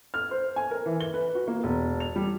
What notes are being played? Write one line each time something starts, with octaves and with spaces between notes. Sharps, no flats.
F6
C5
G#5
A#4
E3
G7
B4
F#4
A#3
E1
F7
G3